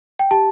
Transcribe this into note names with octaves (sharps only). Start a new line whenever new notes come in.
G5
G4 A5